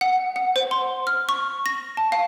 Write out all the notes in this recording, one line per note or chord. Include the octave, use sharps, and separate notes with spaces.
F#5
F#5
C5
C6
F6
C#6
A#6
A5
F5